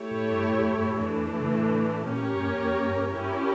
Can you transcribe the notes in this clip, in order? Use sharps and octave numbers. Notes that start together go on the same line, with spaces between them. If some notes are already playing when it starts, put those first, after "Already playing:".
Already playing: A3 E4 G4 C#5
A2
G2
A2
F2
G2
A2
F2 E3 A3 D4
E2
F2
C#3
A2
A#2 A#3 C#4 G4 A#4 C#5
A2
G2
F2
E2
F2
G2
G2
G2 C#4 E4 G4 A#4